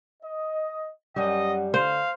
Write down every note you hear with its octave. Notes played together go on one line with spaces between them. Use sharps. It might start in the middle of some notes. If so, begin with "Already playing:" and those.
D#5
F#2 G3 C#4 D#5 F#5
D3 C5 F5